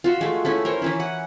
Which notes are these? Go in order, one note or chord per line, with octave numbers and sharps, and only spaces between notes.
F4 F#4 E5
G#3 A3
A3 C#4 E4
A#4 C5 C#5
E3 C#4 E4
F#5